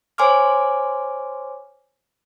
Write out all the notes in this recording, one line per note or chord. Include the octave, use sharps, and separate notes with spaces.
C5 C#5 G#5 C6 D6 F6